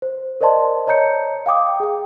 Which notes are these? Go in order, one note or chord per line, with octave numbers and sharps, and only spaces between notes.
C5
A#4 C5 D5 D#5 A5 C6
C#5 D#5 A#5 G6 C#7
F5 G5 D6 D#6
G#4 G5